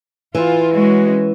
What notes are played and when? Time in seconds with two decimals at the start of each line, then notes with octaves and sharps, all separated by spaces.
0.35 E3 E4 F4
0.75 G#3 C#4 F#4